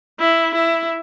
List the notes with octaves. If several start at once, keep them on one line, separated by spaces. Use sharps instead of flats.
E4
E4